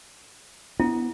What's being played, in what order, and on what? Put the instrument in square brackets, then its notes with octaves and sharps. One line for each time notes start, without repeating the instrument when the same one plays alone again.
[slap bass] B3 [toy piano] E4